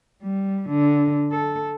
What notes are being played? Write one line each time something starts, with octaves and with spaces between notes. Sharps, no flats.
G3
D3
A4